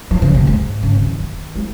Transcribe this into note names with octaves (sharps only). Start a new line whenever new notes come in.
F3
C#3
A#2
G#2
C#3
C#3
D#3
D#3
G#3